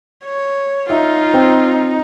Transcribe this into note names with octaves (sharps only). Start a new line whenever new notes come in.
C#5
D#4 F4 E5
C4